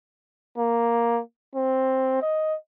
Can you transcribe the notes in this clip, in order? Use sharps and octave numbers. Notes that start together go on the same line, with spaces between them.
A#3
C4
D#5